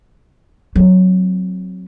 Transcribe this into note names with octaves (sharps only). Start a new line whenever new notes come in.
F#3 C4